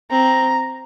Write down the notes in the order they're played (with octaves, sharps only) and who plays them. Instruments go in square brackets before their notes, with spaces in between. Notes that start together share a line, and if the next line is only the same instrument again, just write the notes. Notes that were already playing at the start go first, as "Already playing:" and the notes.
[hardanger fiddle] C4 [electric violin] A#5